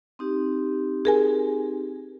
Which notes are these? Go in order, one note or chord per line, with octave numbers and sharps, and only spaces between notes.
C4 D#4 G4
G#4 A#4 G#5